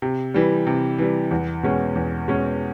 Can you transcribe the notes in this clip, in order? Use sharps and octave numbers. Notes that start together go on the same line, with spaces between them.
C3
E3 G3
C3
E3 G3
E2
B2 G#3 C#4
E2
B2 G#3 C#4